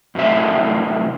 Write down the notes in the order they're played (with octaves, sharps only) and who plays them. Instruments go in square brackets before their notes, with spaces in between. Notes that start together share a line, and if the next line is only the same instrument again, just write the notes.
[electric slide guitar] F#2 A2 C3 E5